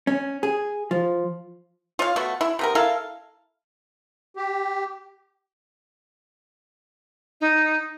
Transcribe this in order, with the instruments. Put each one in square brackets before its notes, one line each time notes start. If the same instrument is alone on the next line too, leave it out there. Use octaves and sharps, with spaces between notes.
[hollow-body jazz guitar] C#4
G#4
F3
[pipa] F4 C#5 F5
A3 B3 F#4
E4
C3 B3 A#4
E4 A4 A#4 F5
[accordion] G4
[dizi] D#4